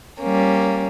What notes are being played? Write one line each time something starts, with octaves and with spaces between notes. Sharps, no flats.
G3 A#3 C#4